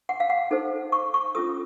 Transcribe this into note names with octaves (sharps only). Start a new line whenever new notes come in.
F#5
F5
F#5
D#4 A4 C5
C#6
C#6
C#4 F4 A4 D#6